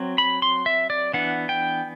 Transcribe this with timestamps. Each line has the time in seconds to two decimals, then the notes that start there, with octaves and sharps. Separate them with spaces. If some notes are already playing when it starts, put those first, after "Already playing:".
Already playing: F#3 C4
0.18 B5
0.42 C6
0.66 E5
0.90 D5
1.14 E3 B3 D4 F#5
1.49 G5